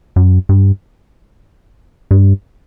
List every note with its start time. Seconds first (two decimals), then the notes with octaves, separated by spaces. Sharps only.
0.16 F#2
0.49 G2
2.11 G2